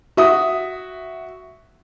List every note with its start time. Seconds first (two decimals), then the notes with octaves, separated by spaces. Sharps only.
0.17 F#4 E5 D#6